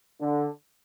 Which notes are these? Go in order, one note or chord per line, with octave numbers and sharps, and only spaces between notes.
D3